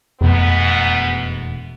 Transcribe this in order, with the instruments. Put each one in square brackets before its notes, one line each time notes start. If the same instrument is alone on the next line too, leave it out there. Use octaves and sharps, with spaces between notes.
[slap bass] E1 B2 A3 [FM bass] F2 [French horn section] G#2 B3